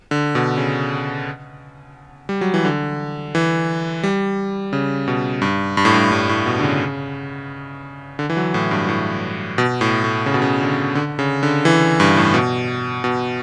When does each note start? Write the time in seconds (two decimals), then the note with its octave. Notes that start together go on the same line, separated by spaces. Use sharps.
0.11 D3
0.35 B2
0.57 C#3
2.29 G3
2.41 F#3
2.54 E3
2.65 D3
3.35 E3
4.03 G3
4.73 C#3
5.08 B2
5.42 G2
5.77 G2
5.85 A2
5.94 G2
6.12 G2
6.29 A2
6.46 B2
6.59 D3
6.63 C#3
8.19 D3
8.30 E3
8.37 F#3
8.54 A2
8.71 G2
8.89 A2
9.58 B2
9.81 A2
10.04 A2
10.26 C#3
10.34 B2
10.42 C#3
10.62 D3
10.95 D3
11.19 C#3
11.43 D3
11.65 E3
12.00 G2
12.17 A2
12.34 B2
13.04 B2